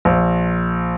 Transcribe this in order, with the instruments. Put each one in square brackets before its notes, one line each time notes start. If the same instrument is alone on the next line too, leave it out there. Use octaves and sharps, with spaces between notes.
[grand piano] A#1